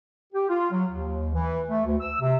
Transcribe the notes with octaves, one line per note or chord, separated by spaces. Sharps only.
G4
F4
F#3
D#2
E3
A3
D2
E6
C3